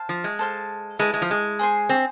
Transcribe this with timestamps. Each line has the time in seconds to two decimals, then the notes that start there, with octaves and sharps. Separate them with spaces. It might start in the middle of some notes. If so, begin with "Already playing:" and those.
Already playing: C5 F5 A5
0.09 F3
0.24 G#3
0.39 A4 C5 F5 A5
0.99 G#3 E4 B4 E5 A5
1.14 G#3
1.22 F3
1.31 G#3
1.59 G#4 C5 G#5 C6
1.89 C4